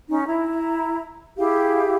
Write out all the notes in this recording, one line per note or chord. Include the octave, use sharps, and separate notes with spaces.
C#4 D#4
E4 A#5
E4 G4 G#4 F5